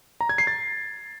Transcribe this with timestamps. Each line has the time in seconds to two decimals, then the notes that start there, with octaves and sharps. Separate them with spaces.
0.21 A#5
0.29 G#6
0.38 C7
0.47 A6